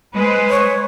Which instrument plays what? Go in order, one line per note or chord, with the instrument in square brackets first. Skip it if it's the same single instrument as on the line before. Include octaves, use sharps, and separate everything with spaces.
[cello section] G#3 B4 C5
[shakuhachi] C#5